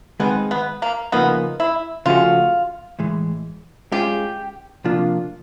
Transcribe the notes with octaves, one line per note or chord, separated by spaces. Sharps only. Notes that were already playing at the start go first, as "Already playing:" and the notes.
D#3 G#3 B3 C4 D#4 G#4
B3
A#3
C#3 F3 A#3 B3 D#4
E4
C#3 F3 A3 C#4 F4 F#4
A2 E3 G#3
G#3 C#4 F4 G4 G#4
C3 F3 A#3 D4 F4